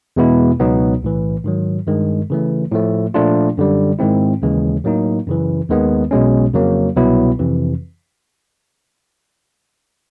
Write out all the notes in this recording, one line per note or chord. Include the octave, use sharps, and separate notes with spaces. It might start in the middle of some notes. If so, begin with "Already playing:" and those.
E2 B2 G#3 B3 E4
C#2 B2 F#3 B3 D#4
B1 A2 E3
G#2 D#3 F#3
G2 D#3 G#3
C#3 E3 A3
A2 F3 A3
A#2 F3 A3 D4 F4
F#2 D3 G3
G#2 D#3 G#3 C4 E4
D#2 C#3 E3 G#3
A2 F#3 A#3 D#4
F#2 C#3 E3
D#2 D#3 G#3 B3
B1 B2 G#3 C#4
F2 C#3 F#3 A#3
C2 B2 F#3 B3 E4
F2 C3 E3